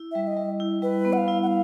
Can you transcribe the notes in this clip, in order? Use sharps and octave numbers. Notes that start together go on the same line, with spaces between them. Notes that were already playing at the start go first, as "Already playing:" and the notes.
Already playing: E4
G3 E5
E5
D#5
G3
E4
G3 B4
B3
F#5
F5
E4
F#5
F5